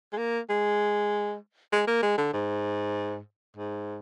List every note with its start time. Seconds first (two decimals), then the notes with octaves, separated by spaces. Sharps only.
0.13 G#3
0.18 A#3
0.50 G#3
1.73 G#3
1.87 A#3
2.02 G#3
2.18 D3
2.33 G#2
3.57 G#2